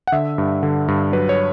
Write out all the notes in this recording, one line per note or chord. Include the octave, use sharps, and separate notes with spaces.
F#5
D3 E5
G2
D3
G2
F#3 B4
C#5